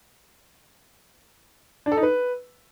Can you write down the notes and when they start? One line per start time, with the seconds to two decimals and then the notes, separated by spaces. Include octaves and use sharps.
1.86 D4
1.92 A4
1.97 D#4
2.03 B4